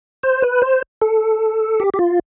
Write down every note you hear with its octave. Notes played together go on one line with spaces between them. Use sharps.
C5
B4
C5
A4
G4
G4
F4